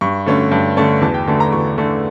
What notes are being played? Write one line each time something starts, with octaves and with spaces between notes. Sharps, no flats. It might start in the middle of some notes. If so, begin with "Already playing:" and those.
G2 C#6
D3 A3 C#4
G2 A5
D3 A3 C#4 A5
E2 A5
G5
D3 A3 A5
A#5
E2 C#6
D3 A3